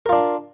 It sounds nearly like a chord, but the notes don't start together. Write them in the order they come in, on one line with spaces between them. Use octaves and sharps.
A#4 F4 D4